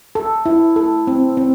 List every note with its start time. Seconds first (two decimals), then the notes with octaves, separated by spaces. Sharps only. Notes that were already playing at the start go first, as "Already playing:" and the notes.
0.15 A4
0.46 E4
0.76 A4
1.07 C4
1.37 C4